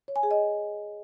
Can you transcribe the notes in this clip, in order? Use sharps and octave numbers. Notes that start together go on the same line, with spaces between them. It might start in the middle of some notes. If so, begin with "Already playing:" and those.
C#5
G#5
G#4
D#5